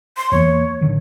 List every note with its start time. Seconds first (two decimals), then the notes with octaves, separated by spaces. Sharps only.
0.17 C6
0.32 E2 E3 A#3 C#5
0.81 A1 D3 D#3